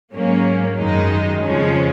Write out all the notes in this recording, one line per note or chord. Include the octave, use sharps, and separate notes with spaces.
G#2 F#3 A#3 C#4
F#2 D#3 G#3 D#4
F2 C#3 F3 G#3 C#4